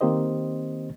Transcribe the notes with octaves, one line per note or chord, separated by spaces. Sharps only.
D#3 A#3 C4 G4 C5 D#5